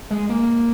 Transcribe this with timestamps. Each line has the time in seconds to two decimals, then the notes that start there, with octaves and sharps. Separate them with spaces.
0.11 G#3
0.29 A#3